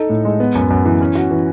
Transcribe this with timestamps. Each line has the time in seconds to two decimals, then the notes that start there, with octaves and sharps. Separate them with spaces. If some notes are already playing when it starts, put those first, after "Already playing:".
Already playing: D#4 A4
0.10 A2
0.25 G#3
0.40 B3
0.55 F#2
0.70 F#2
0.85 E3
1.01 C#4
1.15 F#4
1.31 E3